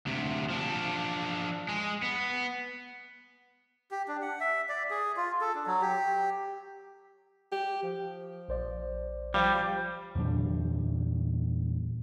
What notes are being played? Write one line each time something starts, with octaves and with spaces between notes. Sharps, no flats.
D2 C3
F3 D4
G#3
B3
G4
D4
F#5
E5
D5
G#4
F4
A4
D4
F#3
G4
G4
F3
A#1 C5 D5
F3 G3
E2 A#2 F#3 D4